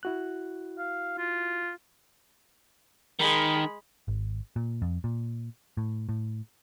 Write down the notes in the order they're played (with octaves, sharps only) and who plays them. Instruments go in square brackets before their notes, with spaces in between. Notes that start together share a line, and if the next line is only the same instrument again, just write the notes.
[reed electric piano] E4 F#4 F#6
[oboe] F5
F4
[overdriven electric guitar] D#3 [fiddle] G#3 B5
[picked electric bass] G#1
A#2
F2
A#2
A2
A2